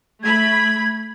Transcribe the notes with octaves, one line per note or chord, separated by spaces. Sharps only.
A3 B5 G#6